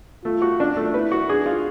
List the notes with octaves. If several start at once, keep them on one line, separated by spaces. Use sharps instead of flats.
A3 F4
F#4
D4
A3
E4 B4
F#4
D4 G#4
F4